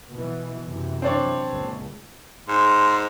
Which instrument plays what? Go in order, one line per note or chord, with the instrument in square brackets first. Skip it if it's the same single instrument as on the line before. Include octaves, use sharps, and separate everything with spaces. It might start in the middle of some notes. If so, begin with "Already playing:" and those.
[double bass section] B2 E3
F#2 C3 E3
[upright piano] C4 D4 C#5
[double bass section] C#2 A#2
[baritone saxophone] G#2 [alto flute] C6